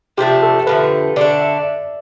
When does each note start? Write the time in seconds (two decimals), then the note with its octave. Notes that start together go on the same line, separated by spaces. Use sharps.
0.18 C3 F3 A3 D4 G4
0.43 A4
0.67 D3 F3 A3 B4
1.16 D3 A3 D4 D5
1.41 E5